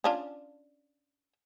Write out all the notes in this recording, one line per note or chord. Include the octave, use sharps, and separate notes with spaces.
C#4 D4 F4